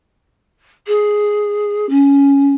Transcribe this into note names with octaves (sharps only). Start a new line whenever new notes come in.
G#4
C#4